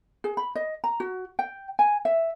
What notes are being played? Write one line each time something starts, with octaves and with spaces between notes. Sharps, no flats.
G#4
B5
D#5
A#5
F#4
G5
G#5
E5